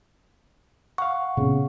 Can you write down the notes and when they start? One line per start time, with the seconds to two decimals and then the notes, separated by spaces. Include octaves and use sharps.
0.98 F5 F#5 C#6
1.37 A#2 C#3 B3 C4